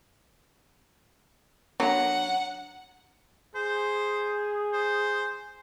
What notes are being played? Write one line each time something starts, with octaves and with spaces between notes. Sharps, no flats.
F#3 D4 F#5 A#5
G#4 C5
C5